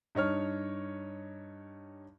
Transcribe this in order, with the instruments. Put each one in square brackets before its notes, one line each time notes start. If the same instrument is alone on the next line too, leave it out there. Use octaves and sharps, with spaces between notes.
[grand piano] G2 D#4 C#5 F6